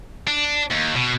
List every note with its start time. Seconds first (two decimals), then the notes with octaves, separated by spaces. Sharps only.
0.28 D4
0.71 D#2
0.96 B2